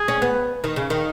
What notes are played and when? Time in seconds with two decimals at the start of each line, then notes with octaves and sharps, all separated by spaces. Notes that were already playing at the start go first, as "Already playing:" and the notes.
Already playing: G#4
0.08 C#4
0.22 B3
0.64 D#3
0.76 C#3
0.90 D#3